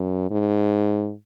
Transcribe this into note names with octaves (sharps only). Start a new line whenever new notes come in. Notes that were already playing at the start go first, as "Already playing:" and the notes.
Already playing: F#2
G#2